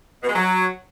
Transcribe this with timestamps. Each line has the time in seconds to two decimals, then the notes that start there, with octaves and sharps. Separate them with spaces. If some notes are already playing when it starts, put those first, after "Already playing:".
0.22 B2
0.28 G#3
0.33 F#3